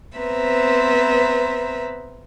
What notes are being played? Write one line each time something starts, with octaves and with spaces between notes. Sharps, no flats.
B3 C4 B4 C5 E5 A#5